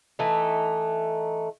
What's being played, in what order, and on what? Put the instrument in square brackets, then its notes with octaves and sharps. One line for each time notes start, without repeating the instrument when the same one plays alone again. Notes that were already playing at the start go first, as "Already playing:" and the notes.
[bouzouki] E3 A3 D#4